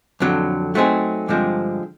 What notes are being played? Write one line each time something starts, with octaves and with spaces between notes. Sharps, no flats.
F2 D3 F#3
F#3 A3 C4 D#4 G#4
G2 D3 F3 G#3 C4